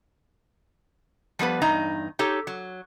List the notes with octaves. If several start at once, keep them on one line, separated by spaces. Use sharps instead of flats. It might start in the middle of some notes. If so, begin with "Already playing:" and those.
F3 G3 B3 B4
E2 G2 D#4 A#5
D#4 G4 A4 C#5
F#3